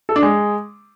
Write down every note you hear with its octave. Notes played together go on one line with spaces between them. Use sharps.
A4
D4
G#3